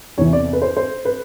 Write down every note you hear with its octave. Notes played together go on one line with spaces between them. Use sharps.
E2 C3 E3 C#5
D5
B4
C5
C5
B4